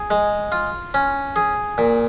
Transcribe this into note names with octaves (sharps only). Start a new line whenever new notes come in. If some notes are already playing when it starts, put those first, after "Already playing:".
Already playing: G#4
G#3
F4
C#4
G#4
A#2